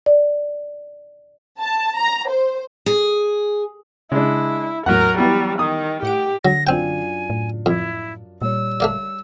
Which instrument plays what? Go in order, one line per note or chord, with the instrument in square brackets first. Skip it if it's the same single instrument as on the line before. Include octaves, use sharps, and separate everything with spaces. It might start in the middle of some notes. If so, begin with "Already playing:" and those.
[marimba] D5
[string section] A5
A#5
C5
[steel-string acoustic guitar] G#4
[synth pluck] C#3 [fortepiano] G#3 D4 [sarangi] E4
[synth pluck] E2 A2 [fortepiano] F#3 F#5 [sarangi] A#4
[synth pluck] E3 B3 E4 [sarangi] G3
[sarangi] D#3 [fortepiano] D#6
[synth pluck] A2 F#5 D7 [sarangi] G4
[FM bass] D3 [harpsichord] F#3 [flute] A#6
[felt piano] F#2 D4 F4 [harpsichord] C4 G5 [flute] G#5
[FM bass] A2
[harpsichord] F2 [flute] E4
[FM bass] A#2 [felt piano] G3 C#5 [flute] E6
[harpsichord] A3 A#3 D5